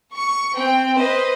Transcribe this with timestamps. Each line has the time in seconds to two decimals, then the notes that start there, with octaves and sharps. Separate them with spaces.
0.14 C#6
0.56 C4 G5
0.96 B4 C5 D#5